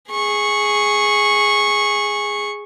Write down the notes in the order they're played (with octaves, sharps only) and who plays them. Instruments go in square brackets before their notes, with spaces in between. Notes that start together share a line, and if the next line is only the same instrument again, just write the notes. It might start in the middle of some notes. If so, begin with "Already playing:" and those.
[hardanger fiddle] G#4 C#6